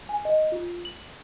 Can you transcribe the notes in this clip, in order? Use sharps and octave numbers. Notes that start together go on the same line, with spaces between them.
G#5
D#5
F4
F#7